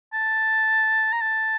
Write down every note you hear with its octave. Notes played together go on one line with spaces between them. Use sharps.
A5
A#5
A5